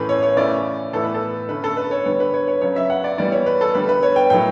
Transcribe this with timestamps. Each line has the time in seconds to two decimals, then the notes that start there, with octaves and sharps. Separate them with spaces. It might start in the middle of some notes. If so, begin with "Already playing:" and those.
Already playing: A2 E3 A3 C#4 B4
0.09 C#5
0.23 C#5
0.37 C#3 E3 A3 C#4 D5
0.93 A2 E3 B3 A4
1.03 B4
1.14 A4
1.49 D3 A3 C#4 B4
1.64 A4
1.77 B4
1.91 C#5
2.06 D3 G3 B3 C#5
2.20 B4
2.34 C#5
2.48 C#5
2.61 C#3 F#3 B3 C#5
2.76 E5
2.90 F#5
3.04 D5
3.18 E3 G3 B3 D5
3.32 C#5
3.46 B4
3.61 A4
3.75 D3 G3 B3 B4
3.89 B4
4.03 C#5
4.16 G5
4.30 A2 F#3 B3 G5